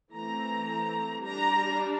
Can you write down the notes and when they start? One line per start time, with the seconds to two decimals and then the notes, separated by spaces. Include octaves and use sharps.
0.13 E3 A3 C4 A#5
1.24 G3 D4 A#5